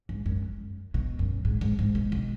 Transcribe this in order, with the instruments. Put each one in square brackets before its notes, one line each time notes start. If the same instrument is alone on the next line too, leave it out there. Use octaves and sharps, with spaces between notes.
[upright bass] G#2
F#2
B2
F#2
G#2
G#2
G#2
B2
B2